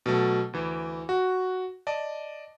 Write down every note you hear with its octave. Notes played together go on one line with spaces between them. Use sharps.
B2 F#3 A3
D2 E3
F#4
D5 D#5 A5